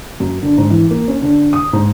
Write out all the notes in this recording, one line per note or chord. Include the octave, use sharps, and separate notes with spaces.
F#2
D3
G#2
E3
A#3
C#4
D3
D#6
G#2